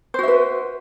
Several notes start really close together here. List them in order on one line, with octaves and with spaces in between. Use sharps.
C5 F#4 E5 B4